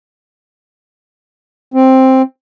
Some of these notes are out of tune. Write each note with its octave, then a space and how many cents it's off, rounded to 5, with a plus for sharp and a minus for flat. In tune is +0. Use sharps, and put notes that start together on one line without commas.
C4 +5